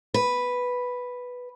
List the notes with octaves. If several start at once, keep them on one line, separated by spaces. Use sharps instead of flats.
B4